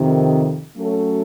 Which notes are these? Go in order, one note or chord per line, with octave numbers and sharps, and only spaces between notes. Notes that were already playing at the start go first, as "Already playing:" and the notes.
Already playing: F2 C3 D#3
F#3 A3 C#4 F#4 A4